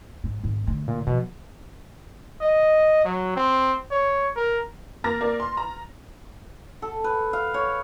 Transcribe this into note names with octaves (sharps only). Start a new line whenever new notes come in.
G#2
G#1 G#2
D3 A3
A#2
B2 F3
D#5
F#3
C4
C#5
A#4
A#3 A#4 A#5 F6 A6 A#6
A#3 A#4 D5
C6
A#5
A4
B4
F5
C#5